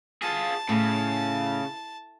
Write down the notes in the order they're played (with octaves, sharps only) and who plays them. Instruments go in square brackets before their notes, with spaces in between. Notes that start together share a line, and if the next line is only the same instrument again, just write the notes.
[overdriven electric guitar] F4 G#4 [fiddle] A5
[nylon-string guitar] A2 [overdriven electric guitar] C#3